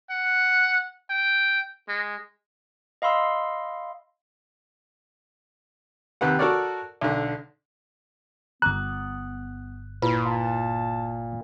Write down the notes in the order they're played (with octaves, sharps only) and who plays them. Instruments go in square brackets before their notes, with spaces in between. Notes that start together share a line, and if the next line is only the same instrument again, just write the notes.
[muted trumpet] F#5
G5
G#3
[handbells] D#5 F5 B5 C6 E6
[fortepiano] D#2 C3 G4 B4 F#5
F#4 A4 A#4 C#5 D5
B1 D3
[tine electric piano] G1 F#6 [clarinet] B3 [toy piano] A#5 D6 D#6
[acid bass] A#2 [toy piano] E4 F4 B4
[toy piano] F5 [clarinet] A5